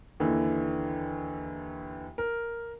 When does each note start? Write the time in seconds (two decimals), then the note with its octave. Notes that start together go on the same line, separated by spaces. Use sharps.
0.20 D#2 D3 E3
2.18 A#4